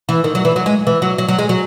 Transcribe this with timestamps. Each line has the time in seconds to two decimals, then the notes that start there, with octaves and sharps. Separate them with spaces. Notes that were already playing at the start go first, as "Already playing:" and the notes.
0.09 E3
0.24 D#3
0.35 F#3
0.45 E3
0.56 F#3
0.66 G#3
0.87 E3
1.02 F#3
1.18 F#3
1.28 F#3
1.39 G#3
1.49 F#3